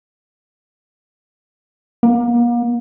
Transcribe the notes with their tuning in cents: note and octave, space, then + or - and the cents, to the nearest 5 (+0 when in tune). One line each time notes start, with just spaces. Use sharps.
A#3 +40